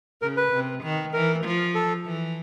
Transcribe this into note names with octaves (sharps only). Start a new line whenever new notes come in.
C#3 A#4
B4
C3
D#3
E3 A#4
F3
A4
E3